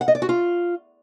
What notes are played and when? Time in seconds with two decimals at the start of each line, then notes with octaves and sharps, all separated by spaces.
0.01 F#5
0.08 D#5
0.15 D5
0.22 F#4
0.29 F4